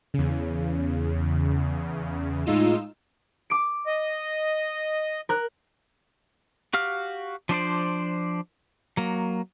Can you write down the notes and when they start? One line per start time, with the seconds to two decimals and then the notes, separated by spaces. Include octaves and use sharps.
0.14 E2 C#3
2.46 A2 G#3 D#4 F4 E6
3.50 D6 D7
3.86 D#5
5.29 A#4 F#6
6.73 F#4 G4 F5 F6
7.49 F3 D4 C5 D5
8.97 F#3 A#3